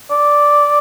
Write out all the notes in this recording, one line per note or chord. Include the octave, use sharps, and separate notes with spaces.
D5